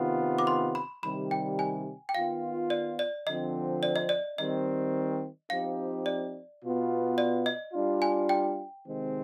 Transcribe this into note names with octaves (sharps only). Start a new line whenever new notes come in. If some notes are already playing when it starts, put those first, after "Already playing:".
Already playing: C3 D#3 B3 F4
D6
C6
B5
C3 D#3 G3 B5
G5
G#5
G5
D#3 B3 F4 F5
D5
D5
D3 F3 C4 D#5
D5
D#5
D5
D#3 G3 C4 D#5
F3 C4 D#4 G4 F5
D5
B2 B3 F4
D5
D#5
G3 D4 F4
G#5
G5
C3 D#3 G#3 C4